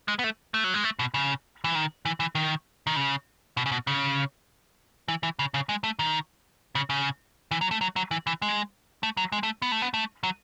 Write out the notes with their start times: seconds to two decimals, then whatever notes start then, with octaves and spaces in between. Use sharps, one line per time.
0.08 G#3
0.19 B3
0.24 A3
0.54 A3
0.64 F#3
0.74 G#3
0.84 A3
0.99 B2
1.14 C#3
1.64 E3
1.75 D#3
2.05 E3
2.20 E3
2.35 D#3
2.87 D#3
2.96 C#3
3.57 B2
3.66 C#3
3.72 B2
3.87 C#3
5.08 E3
5.23 E3
5.39 C#3
5.54 C#3
5.69 G#3
5.84 A3
5.99 D#3
6.75 C#3
6.90 C#3
7.51 E3
7.61 F#3
7.71 A3
7.81 F#3
7.96 F#3
8.11 E3
8.27 E3
8.42 G#3
9.03 A3
9.17 F#3
9.32 G#3
9.43 A3
9.62 B3
9.72 A3
9.82 B3
9.94 A3
10.23 F#3